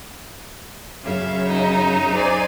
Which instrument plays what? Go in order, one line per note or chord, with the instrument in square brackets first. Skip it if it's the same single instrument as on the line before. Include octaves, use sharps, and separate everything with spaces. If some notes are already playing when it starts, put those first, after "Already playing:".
[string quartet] F#2 C#3 E5 [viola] F5
[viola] D#4
[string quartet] C5 D5 G#5